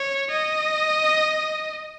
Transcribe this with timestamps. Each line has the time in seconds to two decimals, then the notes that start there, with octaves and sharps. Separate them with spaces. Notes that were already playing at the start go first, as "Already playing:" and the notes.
Already playing: C#5
0.31 D#5